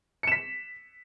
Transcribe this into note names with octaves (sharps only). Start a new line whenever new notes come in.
B6 C#7 E7